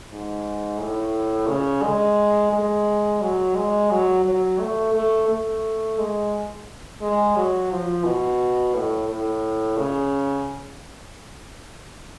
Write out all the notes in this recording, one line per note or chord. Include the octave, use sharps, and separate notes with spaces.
G#2
A2
C#3
G#3
G#3
F#3
G#3
F#3
F#3
A3
A3
A3
G#3
G#3
F#3
F3
B2
A2
A2
C#3